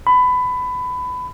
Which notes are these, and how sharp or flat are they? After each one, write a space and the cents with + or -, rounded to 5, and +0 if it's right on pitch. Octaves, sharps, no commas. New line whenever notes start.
B5 +20